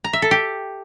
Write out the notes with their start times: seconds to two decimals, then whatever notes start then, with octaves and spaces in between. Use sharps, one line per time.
0.04 A#5
0.13 E5
0.22 A4
0.31 G4